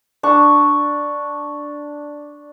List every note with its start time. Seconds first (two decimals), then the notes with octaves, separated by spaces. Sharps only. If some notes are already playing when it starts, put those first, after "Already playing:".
0.23 D4 C#6